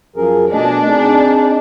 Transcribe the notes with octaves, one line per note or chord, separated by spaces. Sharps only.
F#2 F3 G#4 A#4
B2 A3 D4 D#5 G#5
C4 D#4 G#4